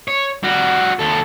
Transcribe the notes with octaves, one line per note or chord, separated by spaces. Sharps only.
C#5
G3 F#4
D#2 A4